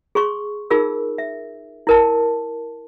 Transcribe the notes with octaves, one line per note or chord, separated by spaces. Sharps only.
G#4 C6 C#6
D#4 F4 G#4 A#4 E6
E5
E4 A#4 A5